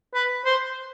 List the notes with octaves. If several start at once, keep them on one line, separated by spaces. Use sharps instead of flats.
B4
C5